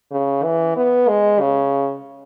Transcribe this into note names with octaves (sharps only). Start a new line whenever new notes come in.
C#3
E3
B3
G#3
C#3